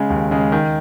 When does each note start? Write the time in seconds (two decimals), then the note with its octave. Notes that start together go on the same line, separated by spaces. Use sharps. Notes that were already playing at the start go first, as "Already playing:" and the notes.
Already playing: C#3 G#3
0.10 D#2
0.31 C#3 G#3
0.52 D#3